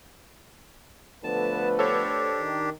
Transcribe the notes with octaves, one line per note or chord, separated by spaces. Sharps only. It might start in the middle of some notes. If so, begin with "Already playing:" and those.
D3 F3 A3 B3 B4 A5
D4 G4 A4 C5 C#5
D#3